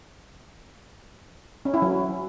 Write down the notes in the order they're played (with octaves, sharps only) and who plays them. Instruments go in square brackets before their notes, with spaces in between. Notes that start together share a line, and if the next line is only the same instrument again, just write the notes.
[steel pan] C#4
E4
F#3